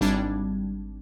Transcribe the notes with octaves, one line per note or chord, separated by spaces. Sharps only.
G#1 G3 D4 A5 G#6